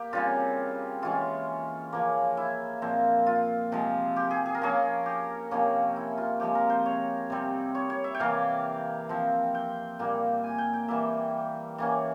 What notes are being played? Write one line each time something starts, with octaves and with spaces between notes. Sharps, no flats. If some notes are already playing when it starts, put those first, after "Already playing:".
Already playing: A#3 G4
C#3 G3 C4 F4
E3 G#3 C#4 F4
C#3 F3 A#3
E4
A#2 F3 C4
F4
C3 F3 G#3
G4
G#4
G#4
A#4
F3 A#3 C#4 G#4
G4
C3 F3 A#3 C#4
E4
F4
C3 F3 G#3 G4
A#4
C5
C#5
C3 G3 C4
C#5
C#5
E5
G5
C3 E3 A#3 F5
F3 C4
G5
A#2 G3 A#3
G#5
G5
G5
E3 G3 A#3 E5
E3 A#3 C#4